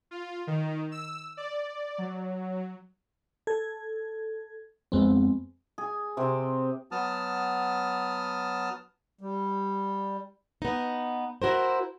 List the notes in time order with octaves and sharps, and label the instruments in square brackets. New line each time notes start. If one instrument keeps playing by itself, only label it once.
[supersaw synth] F4
D#3
E6
D5
F#3
[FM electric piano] A4 G#6
F2 G#3 B3 C4
[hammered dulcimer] G#4
C3 C4 G4
[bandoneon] F#3 B3 A5 D#6 F6
[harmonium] G3
[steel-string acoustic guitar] B3 D#4
E4 F#4 A#4 C5